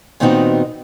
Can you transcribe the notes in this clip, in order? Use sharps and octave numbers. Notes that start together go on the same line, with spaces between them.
A#2 D#3 B3 C4 D#4 F#4